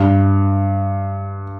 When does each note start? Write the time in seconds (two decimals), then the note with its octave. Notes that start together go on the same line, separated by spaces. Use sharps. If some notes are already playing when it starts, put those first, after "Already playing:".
Already playing: G2